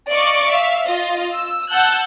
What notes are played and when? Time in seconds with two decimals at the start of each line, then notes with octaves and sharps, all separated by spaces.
0.10 D5 D#5 F5 C#6 D6
0.50 E5 F5
0.87 F4 D#5
1.33 E6
1.69 F#5 A5 E6 F#6 G6